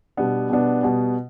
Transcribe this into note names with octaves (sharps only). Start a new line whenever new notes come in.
B2 G3 B3 D4
B2 G3 B3 D4
B2 G3 B3